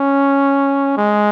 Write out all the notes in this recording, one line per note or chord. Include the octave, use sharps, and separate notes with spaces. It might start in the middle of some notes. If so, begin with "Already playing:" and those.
Already playing: C#4
G#3